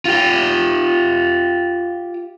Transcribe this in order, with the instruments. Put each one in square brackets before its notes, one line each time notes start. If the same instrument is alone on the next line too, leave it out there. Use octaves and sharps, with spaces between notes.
[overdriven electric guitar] F4 G4